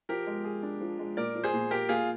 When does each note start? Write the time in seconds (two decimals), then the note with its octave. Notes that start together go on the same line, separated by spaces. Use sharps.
0.09 F3 G4 A#4
0.27 G#3
0.44 G#4
0.63 D4
0.80 F3
0.99 G#3
1.17 A#2 A#4 D5
1.35 F3
1.44 G#4 C5
1.53 A#2
1.71 A#3 G4 A#4
1.89 A#2 F4 G#4